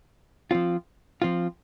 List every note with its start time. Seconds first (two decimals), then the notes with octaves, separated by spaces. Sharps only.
0.51 F3 C4 F4
1.22 F3 C4 F4